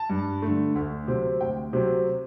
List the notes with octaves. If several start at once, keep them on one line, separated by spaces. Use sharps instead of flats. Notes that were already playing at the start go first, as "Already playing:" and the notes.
Already playing: A5
G2
D3 A3
D2
C3 F#3 C4
D2 G5
C3 F#3 C4